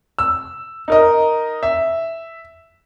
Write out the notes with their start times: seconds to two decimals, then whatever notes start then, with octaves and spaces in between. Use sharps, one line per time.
0.19 E6
0.88 D#4 A#4 D#5
1.63 E5